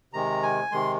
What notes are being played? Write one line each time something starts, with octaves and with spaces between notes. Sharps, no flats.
C3 D#3 G#3 A#5
G#5
C3 D#3 G#3 C6